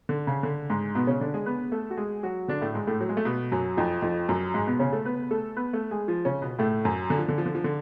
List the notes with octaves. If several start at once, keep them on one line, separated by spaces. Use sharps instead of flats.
D3
C#3
D3
G#2 G#3
B2 B3
C#3 C#4
D3 D4
G#3 G#4
B3 B4
A3 A4
F#4
G#3 G#4
F#3 F#4
D3 D4
A2 A3
G#2 G#3
A2 A3
F#3
G#3
A3
B2 B3
F#2 F#3
F2 F3
F2 F3
F#2 F#3
G#2 G#3
B2 B3
C#3 C#4
A3 A4
B3 B4
A3 A4
B3 B4
A3 A4
G#3 G#4
F3 F4
C#3 C#4
B2 B3
A2 A3
F#2 F#3
D3
F3
D3
F3
D3
F3
D3